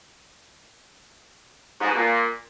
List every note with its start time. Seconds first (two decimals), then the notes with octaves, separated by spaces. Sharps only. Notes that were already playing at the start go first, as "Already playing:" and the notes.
1.81 G#2
1.88 B2
1.95 A#2